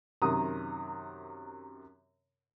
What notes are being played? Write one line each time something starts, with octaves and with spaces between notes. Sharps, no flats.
F#2 C3 D#3 A#5 D#6